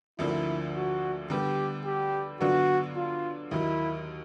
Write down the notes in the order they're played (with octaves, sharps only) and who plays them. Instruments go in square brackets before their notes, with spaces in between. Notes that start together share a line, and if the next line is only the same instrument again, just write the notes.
[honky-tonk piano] D2 D3 F3 A#3 D4 [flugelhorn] E4
[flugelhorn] F#4
[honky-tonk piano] D3 G3 B3 [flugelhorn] G4
[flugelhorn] G4
[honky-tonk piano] D3 F#3 B3 D4 F4 [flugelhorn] F#4
[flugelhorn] F4
[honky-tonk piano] D#2 D#3 F#3 A#3 [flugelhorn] E4